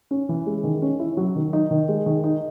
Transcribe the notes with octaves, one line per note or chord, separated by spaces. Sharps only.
C#4
E3
G#3
D#3
C#4
E4
F#3
D#3
D#4
D#3
G#3
D#3
D#4